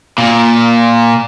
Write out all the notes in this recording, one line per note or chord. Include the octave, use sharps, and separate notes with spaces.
A#2